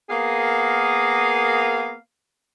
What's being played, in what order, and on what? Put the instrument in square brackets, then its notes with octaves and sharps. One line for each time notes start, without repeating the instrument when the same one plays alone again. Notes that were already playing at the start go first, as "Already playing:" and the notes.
[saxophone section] A#3 B3 G#4 A#4 F5